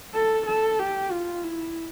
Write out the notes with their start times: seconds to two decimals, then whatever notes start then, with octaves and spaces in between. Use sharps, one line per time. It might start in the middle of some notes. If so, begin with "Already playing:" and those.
0.14 A4
0.46 A4
0.79 G4
1.11 F4
1.43 E4